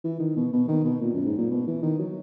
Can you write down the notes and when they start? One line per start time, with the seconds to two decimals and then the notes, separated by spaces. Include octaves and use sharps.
0.04 E3
0.19 D#3
0.36 B2
0.53 B2
0.68 D#3
0.84 B2
1.01 A#2
1.13 F#2
1.25 G#2
1.38 A#2
1.51 B2
1.67 E3
1.82 D#3
1.99 F#3